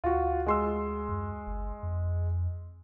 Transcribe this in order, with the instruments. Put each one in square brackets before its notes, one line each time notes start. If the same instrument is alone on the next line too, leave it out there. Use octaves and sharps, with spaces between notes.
[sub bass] D2 [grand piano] F4 F#4
[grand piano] G#3 C6 E6
[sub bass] F#2
G1
F2